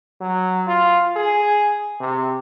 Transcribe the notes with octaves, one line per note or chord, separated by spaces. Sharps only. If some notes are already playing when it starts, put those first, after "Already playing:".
F#3
F4
G#4
C3